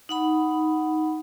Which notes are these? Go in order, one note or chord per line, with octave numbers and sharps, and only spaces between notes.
D#4 F#5 B5